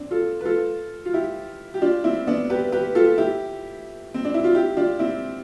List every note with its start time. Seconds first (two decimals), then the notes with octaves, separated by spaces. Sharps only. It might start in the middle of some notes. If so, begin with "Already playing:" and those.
Already playing: C4 D4
0.11 F4 A4
0.41 B4
0.45 F4 A4
1.06 F4
1.13 E4 G4
1.74 G4
1.82 D4 F4
2.04 C4 E4
2.27 B3 D4
2.50 G4 B4
2.72 G4 B4
2.95 F4 A4
3.18 E4 G4
4.14 C4
4.25 D4
4.34 E4
4.44 F4
4.54 E4 G4
4.77 D4 F4
4.99 C4 E4